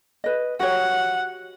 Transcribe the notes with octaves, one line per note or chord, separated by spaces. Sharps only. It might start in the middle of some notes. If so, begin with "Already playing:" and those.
B4 D#5
F#4 G4 C#5 F#5